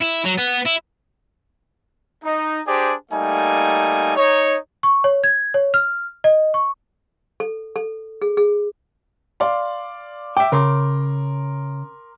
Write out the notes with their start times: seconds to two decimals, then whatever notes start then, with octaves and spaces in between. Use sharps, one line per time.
0.01 E4
0.25 F#3
0.38 B3
0.65 E4
2.23 D#4
2.67 D4 G4 G#4 C5 D5
3.12 G3 A3 A#3 D#4 G#5
4.17 D#4 C#5
4.83 C#6
5.04 C#5
5.24 G#6
5.54 C#5
5.74 F6
6.24 D#5
6.54 C#6
7.40 A4
7.76 A4
8.22 G#4
8.37 G#4
9.40 D5 F5 C6
10.37 E5 G5 D6
10.52 C#3 A#4 C6 D6